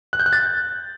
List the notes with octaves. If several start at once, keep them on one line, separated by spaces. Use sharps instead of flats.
F#6
G6
F#6
A6